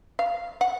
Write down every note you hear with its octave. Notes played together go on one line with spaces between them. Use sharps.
F5
F#5